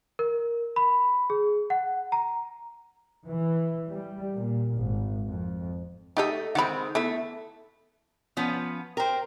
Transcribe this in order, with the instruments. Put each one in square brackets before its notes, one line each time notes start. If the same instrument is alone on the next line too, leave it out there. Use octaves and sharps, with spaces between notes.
[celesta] A#4
B5
G#4
F#5
A#5
[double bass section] E3
G3
A#2
G#1
F2
[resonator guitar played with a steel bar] A3 D#5 [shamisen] D#4 G4 A4
[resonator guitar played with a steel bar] D#3 G#3 C4 [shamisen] F#5 B5
[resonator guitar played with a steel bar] A3 [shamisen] B3 E4
[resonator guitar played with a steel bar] F3 B3 C#4
[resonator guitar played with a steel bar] A#4 C5 [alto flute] G5